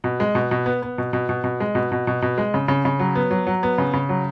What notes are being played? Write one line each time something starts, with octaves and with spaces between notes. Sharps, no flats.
B2
G#3
B2
B2
B3
B3
B2
B2
B2
B2
G#3
B2
B2
B2
B2
G#3
C#3
C#3
C#3
F#3
B3
F#3
F#3
B3
C#3
C#3
F#3